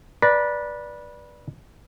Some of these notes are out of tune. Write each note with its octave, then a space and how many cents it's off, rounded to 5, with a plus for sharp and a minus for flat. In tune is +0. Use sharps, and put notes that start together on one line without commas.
B4 -20 D5 +0 A#5 +0